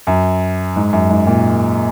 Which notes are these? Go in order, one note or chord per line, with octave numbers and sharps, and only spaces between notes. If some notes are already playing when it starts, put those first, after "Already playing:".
F#2
G#2
F#2
G#2
A#2